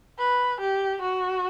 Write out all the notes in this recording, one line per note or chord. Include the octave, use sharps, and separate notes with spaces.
B4
G4
F#4